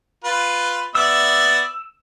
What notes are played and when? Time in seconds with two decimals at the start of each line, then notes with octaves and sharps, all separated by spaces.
0.24 F4 B4
0.95 B3 D5 E5 E6